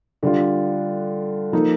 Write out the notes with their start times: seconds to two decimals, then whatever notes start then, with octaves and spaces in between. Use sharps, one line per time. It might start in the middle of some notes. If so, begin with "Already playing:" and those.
0.23 D3 G3 D4 F4
1.52 F3 A#3 D#4 A4